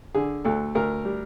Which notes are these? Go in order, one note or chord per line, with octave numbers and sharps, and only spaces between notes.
D3 G#4
D2 A4
D2 A#4
G3